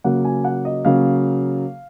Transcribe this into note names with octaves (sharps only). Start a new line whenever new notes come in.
C#3 F#3 A#3 F#5
G#5
F#5
D#5
C#3 F#3 A#3 F5